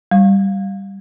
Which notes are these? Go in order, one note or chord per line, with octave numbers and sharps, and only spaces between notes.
G3